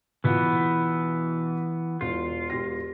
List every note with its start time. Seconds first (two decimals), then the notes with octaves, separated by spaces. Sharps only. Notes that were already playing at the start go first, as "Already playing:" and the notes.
0.24 B2 E3 B3 F4
2.01 E1 F4
2.50 E1 G4 A#6